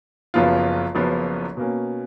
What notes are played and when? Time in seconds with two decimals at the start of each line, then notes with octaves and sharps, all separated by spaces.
0.34 F#1 F#2 F3 B3 F4
0.95 F#1 F#2 F3 B3 F4
1.57 B2 A#3 C#4